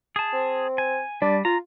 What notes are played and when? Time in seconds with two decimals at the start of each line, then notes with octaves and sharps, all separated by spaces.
0.16 G#4 A5
0.33 C4
0.78 G#5
1.22 G3 D4
1.45 F4 A#5